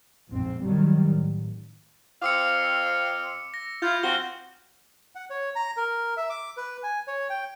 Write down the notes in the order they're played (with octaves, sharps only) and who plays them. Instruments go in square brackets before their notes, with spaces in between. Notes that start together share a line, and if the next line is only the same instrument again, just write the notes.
[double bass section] A#1 F2 G#2 C4
D#3 F#3 G3
A1
[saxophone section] F2 C4 F5 [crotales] D6 E6 C#7
[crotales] A#6
[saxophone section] E4 F4 [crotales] G6
[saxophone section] C4 F4 F#4 [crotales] F6 G7
[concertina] F#5
C#5
A#5
A#4
E5
D6
B4
G#5
C#5
G5